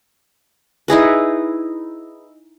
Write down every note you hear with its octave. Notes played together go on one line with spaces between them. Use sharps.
D#4 E4 G#4 B4